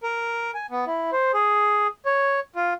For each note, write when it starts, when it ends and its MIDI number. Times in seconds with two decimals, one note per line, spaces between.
0.03 0.51 70
0.55 0.66 80
0.71 0.85 59
0.87 1.10 64
1.12 1.31 72
1.34 1.87 68
2.06 2.40 73
2.56 2.73 65